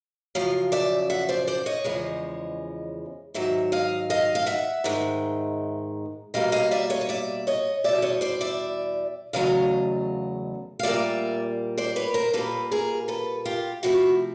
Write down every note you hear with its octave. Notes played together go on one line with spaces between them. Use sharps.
F#2 C#3 F3 F5
D5 E5
E5 F#5
C5 D5
C5 D5
C#5 D#5
E2 C#3 F3 G#3
G#2 D#3 F#3 E5
D#5 F5
D#5 F5
F5
E5 F#5
G#2 D#3 G#3
B2 G3 A#3 D#5 F5
D#5 F5
D5 E5
C#5 D#5
D#5
D5 E5
C#5 D#5
E2 B2 G3 D5 E5
C#5 D#5
C5 D5
D5 E5
E2 C#3 F#3 A3 D#5 F5
F5
A#2 G3 A#3 D5 E5
C5 D5
B4 C#5
A#4 C5
A#2 G3 A#3 A4 B4
G#4 A#4
A4 B4
F4 G4
C3 F3 A3 E4 F#4